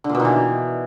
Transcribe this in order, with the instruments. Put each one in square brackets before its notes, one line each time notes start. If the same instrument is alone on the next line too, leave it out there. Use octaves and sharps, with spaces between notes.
[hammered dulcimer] D3
A#2
B2
D#3
E3